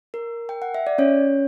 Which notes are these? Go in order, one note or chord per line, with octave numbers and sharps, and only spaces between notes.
A#4
G5
F#5
E5
D5
C#4 C#5